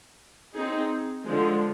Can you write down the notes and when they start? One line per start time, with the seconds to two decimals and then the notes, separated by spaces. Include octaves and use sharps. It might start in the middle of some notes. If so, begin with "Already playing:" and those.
0.53 C4 D#4 G#4
1.25 D3 F3 G#3